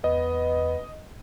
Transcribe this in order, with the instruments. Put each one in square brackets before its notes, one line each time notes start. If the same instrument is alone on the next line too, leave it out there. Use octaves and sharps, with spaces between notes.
[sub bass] E2 [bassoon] B3 [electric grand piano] D#5